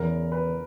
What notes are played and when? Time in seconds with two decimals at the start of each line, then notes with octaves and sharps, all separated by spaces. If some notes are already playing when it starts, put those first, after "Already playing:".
Already playing: E2 C#3 E3 A#4
0.32 B4